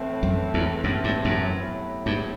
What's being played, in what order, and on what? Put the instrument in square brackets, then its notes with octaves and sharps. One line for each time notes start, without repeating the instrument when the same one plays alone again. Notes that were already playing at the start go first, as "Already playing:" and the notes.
Already playing: [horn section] A2 E3 A3 C4
[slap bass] F#2
E2
F#2
G2
F#2
[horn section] A2 F#3 B3 E4 G4
[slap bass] G2